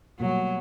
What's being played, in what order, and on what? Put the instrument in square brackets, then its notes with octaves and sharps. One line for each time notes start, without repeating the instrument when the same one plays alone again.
[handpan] B2 G3 A#3 [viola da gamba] F#3